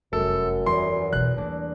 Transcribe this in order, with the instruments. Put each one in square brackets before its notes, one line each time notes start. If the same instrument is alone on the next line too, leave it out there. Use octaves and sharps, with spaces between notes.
[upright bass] F1 G3 [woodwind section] F#2 [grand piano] A4
[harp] E2 G3 [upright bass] F3 [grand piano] C6
[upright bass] B2 E3 [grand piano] F#6
[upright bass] D3 C4 [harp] A3 A#3 D4